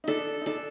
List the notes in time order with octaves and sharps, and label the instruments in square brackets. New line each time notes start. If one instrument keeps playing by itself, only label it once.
[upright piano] D#4
[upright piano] D4 [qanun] A4
[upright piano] D#4
[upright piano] D4 [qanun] A4